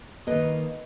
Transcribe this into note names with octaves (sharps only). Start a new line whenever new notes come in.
D#3 A#3 B4 D#5